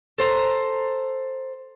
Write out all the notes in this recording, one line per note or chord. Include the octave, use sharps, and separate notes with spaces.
A4 C5 A#5